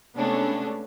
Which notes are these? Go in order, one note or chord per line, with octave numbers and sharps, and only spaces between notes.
C3 G#3 A3 B3 C#4 D4